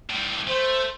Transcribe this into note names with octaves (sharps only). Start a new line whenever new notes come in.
A2 G3
A3 C5